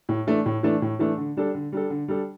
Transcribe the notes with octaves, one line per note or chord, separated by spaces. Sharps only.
A2
E3 A3 D4
A2
E3 A3 D4
A2
E3 A3 D4
D3
G3 D4 A4
D3
G3 D4 A4
D3
G3 D4 A4